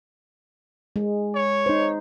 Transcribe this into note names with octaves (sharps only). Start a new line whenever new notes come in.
G#3
C#5
D#4 C5